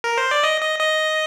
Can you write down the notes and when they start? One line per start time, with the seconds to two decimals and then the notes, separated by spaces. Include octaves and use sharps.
0.04 A#4
0.18 C5
0.31 D5
0.43 D#5
0.61 D#5
0.79 D#5